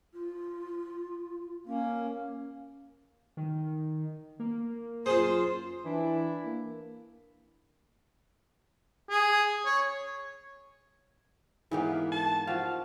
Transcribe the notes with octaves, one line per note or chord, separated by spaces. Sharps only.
F4
A#3 C#4
D#3
A#3
F#2 F4 G#4 C5
E3 D4 E4
A#3
G#4
C#5
G#2 E3 A#3 B3 E4 G4 F5
A5
F3 F#4 G4 F5